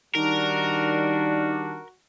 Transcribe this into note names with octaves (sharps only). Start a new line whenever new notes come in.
D#3 G3 D4 D#4 F#4 A#4